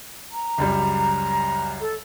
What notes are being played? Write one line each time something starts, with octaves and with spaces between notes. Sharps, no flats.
A#5
C#2 F#2 G3
A4